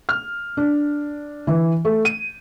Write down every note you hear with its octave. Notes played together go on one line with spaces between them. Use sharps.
F6
D4
E3
A3
D#7